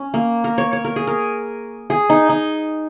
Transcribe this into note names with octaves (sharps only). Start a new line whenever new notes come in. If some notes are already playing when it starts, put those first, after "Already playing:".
Already playing: C#4
A#3
A#4
C#5
C#5
A#4
G#4
A#4
G#4
D#4
D#4